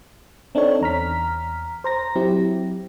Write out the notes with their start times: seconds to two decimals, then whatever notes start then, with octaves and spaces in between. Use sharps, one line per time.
0.55 C4 D4 D#4 A4 C#5
0.81 E2 A#5 F6 B6
1.84 C5 A#5 A#6
2.15 F#3 C4 E4 G4